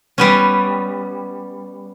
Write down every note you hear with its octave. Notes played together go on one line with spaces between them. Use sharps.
G3 B3 C#4